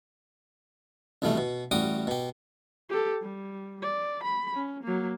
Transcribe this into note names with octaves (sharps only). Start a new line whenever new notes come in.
C2 F2 B2 E3 A3
B2
A1 G3 F#4 D6 D#6
B2 G4
G4 A4
G3
D5
B5
C#4
F#3 A#3